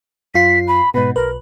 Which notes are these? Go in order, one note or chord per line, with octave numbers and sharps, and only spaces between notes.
F#2 F4 B6 C7
B5
G#2 B2 B4
B1 A#4 B4